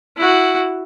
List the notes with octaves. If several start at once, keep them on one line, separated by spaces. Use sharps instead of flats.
E4 F#4